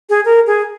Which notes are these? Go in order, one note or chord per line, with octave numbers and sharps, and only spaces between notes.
G#4
A#4
G#4